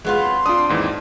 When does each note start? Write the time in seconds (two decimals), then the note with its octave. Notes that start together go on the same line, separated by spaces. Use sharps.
0.05 F#3 G#3 B3 F4
0.18 C4 C6
0.46 C4 D4 F4 D#6
0.69 D#2 G#2 E3